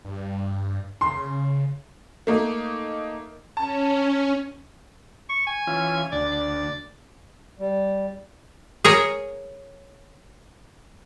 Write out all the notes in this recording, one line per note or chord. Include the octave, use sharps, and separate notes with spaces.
G2
C#3 C6
A3 A#3 D#4
C#4 A5
C#6
G#5
E3 C#4 F4
D2 D5
D5
G3
G#4 A#4 C#5